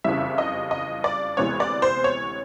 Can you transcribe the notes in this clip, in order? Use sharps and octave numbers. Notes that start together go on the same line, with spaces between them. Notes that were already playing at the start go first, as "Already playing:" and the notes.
F#1 F2 C#3 E3 G3 E5
D#5
D#5
D5
D2 C3 E3 G#3 B3 C#5
D5
C5
C#5